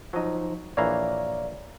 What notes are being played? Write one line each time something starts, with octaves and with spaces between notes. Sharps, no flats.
F3 F#3 D#4 D#5
A#1 E3 A#3 C#5 D5 F5 A#5